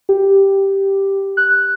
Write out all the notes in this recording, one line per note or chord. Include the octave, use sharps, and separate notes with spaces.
G4
F#6